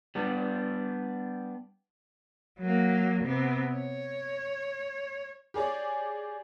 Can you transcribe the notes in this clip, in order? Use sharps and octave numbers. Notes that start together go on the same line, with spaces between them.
G3 B3 D4
F#3 A#3
C3 B3
C#5
G4 G#4 C#5 D5